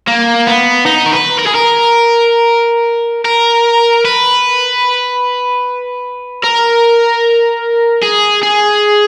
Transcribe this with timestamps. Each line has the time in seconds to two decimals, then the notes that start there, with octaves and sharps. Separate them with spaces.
0.07 A#3
0.47 B3
0.86 D#4
1.06 A#4
1.13 B4
1.39 A#4
1.47 G#4
1.55 A#4
3.25 A#4
4.05 B4
6.43 A#4
8.02 G#4
8.43 G#4